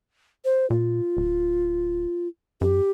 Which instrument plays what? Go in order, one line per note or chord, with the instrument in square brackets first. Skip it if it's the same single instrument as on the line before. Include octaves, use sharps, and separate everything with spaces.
[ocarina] C5
[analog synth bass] A#2 [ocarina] F4
[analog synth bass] D1
[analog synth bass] F#2 [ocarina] G4